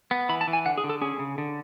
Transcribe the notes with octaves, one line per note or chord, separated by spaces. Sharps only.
B3
E3 B5
A5
E3
G#5
D3 F#5
G#4
D3
A4
C#4 G#4
C#3
D3